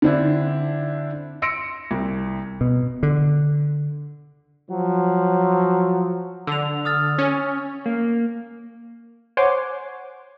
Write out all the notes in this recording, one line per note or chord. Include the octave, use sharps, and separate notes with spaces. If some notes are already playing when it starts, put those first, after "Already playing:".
D3 C4 D4 E4
C6 E6 A#6 C#7 D7
C2
B2
D3
F3 F#3
D3 E6 F7
D#6 F6 A6
C#4
A#3
C5 C#5 F#5 G#5 C6 D6